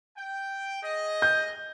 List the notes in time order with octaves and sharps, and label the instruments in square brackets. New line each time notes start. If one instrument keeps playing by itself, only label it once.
[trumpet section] G5
G#4 D#5
[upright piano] G6